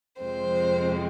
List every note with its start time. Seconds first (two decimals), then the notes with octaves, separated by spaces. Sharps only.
0.22 F2 C3 F3 G#3 C4 C5